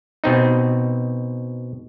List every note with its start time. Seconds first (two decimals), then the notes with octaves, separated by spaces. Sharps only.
0.24 B2 C4 D#4